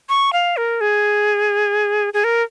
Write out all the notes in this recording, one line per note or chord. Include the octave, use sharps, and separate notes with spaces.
C#6
F5
A#4
G#4
G#4
A#4